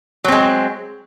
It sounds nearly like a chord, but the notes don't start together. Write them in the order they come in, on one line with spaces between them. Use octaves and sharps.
F#3 C4 G#3